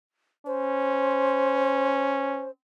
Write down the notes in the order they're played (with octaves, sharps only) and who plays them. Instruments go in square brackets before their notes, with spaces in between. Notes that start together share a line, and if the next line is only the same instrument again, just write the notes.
[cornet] C#4 [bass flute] C5